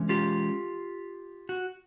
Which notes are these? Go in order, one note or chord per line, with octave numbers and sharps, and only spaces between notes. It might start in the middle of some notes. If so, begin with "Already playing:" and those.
Already playing: E3 G#3 C#4
F4 G4
F#4